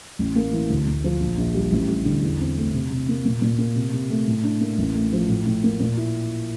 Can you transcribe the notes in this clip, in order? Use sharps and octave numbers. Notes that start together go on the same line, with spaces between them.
A1
A#3
E3
D2
D2
F3
A#1
A#1
G3
A1
G3
D3
E2
C4
A3
C3
C3
A#3
A#2
A#2
A#3
C3
C3
A3
A2
D4
A#3
A1
A3
F3
A2
A2
A#3
A#2
E4